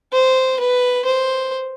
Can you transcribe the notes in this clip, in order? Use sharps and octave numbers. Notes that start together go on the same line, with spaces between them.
C5
B4
C5